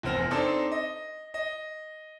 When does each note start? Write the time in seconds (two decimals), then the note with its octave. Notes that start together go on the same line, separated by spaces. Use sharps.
0.03 F1 E2 C4 F6 A#6
0.31 C4 D4 D#4 A4 A5 C6
0.72 D#5
1.34 D#5